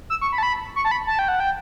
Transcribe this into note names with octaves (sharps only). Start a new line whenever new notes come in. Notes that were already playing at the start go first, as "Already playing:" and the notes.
E6
C#6
B5
A5
B5
C#6
A5
B5
A5
G5
F#5
G5